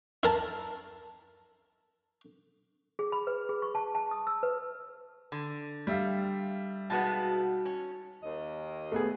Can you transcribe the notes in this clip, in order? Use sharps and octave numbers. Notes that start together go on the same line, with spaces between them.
E4 A#4 A5
G#4
B5
B4
G#4
C#6
A5
A5
D#6
E6
B4
D3
G3 E5 F5
B2 G#3 B3 D#4 F#4 A5
C#4
D#2 D#5
A3 B3 G#4